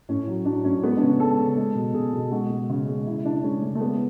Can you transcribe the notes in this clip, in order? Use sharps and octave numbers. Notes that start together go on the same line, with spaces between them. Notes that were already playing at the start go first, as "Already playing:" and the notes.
A2 C#4
F#3
F#3 D4
A2 C#4
G#3 B3
D4
C#3 C#4
G#3 A4
C#3
G#3
B2
B2 G#4
B2
G#3 F#4
G#3
C#3
G#3
C#3 E4
C#3 D4
G#3 C#4
C#3 A3
A3
G#3 B3